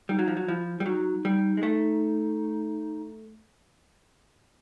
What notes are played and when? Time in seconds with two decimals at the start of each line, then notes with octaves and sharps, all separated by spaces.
0.09 G3 D#4
0.19 F#3
0.28 F3
0.37 F#3
0.47 F3 E4
0.80 G3
0.86 F#3 D#4
1.25 G3
1.57 G#3
1.63 A3